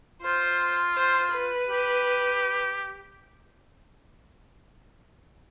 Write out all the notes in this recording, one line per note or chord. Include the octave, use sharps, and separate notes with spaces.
F4 C5
C5
B4
G4